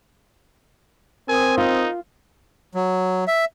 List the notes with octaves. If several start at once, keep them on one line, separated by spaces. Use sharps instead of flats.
C4 A#4 G#5 D#6
D#4 F4
F#3
E5